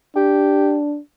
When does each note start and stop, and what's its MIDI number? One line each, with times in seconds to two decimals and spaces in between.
0.16 0.99 62
0.16 0.76 67